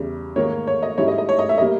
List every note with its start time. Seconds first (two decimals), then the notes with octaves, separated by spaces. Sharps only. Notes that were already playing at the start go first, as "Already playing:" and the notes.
Already playing: E2 C#3 G3
0.36 G#2 D#3 A#3 D#4 C#5
0.67 C#5
0.83 D#5
0.98 G#2 G3 C#4 E4 C#5
1.08 D#5
1.18 D#5
1.29 C#5
1.39 D#5
1.49 E5
1.58 G3 A#3 D#5